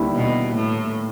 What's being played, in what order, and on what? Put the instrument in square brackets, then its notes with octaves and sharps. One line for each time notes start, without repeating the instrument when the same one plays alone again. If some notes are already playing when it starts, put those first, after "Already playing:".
Already playing: [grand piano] D#2 D3 G3 B3 E4
[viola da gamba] B2
A2